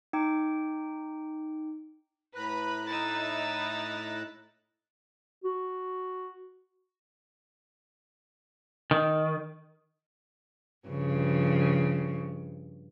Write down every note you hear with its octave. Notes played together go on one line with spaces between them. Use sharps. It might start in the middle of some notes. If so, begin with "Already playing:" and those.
D#4 G5 D6
A2 B4 A#5 B5 F#6
D#4 E4 E6 A6
F#4
D#3
G2 C#3 F3